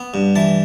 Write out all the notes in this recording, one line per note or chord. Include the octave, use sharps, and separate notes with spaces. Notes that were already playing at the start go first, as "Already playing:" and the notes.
Already playing: B3
G2
E3 A5